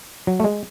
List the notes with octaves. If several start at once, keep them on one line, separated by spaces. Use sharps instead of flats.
F#3
A3
G#3